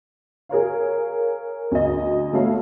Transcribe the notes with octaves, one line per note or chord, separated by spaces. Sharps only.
G#4 A#4 C#5 F5
D2 D#5
A3 B3 A4 C#5 F5